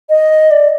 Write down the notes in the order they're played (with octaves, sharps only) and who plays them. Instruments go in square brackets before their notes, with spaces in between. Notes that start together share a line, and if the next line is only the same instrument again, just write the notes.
[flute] D#5
D5